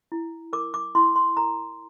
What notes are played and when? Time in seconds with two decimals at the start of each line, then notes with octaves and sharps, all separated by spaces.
0.12 E4
0.53 A#4 D6
0.74 D6
0.95 E4 C6
1.16 C6
1.37 A#4 A#5